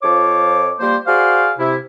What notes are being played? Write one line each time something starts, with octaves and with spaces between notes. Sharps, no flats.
F2 F3 C#5 D6
F3 G3 A#3 C5
F#4 G#4 C5 D5 F5
C3 E4